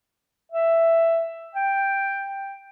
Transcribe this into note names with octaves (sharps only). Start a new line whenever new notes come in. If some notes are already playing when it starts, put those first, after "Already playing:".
E5
G5